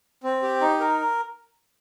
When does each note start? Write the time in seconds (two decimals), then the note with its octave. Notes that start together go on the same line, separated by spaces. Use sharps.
0.24 C4
0.42 G4
0.61 D#4
0.80 A#4